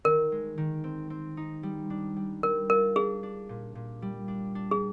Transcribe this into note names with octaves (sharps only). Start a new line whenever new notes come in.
D#3 A#4
G#3
D#3
C4
C4
D#4
G3
D4
G3
G3 A#4
F4 A#4
D4 G#4
D4
A#2
A#2
G3
D4
D4
G#4